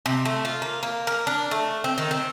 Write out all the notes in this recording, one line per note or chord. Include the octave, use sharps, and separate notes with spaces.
C3
A3
F4
A#3
A#3
A#4
D4
A3
C4
D#3
C4